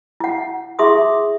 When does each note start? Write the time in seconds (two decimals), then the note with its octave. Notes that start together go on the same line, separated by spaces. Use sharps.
0.20 E4 F#5
0.79 E4 G#4 E5 C6 D6 D#6